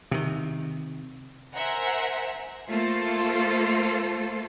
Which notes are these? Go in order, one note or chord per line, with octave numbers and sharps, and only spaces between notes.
C3 D#3
A#4 C5 E5 F#5 G#5 A#5
A3 A#3 F4 A4 C5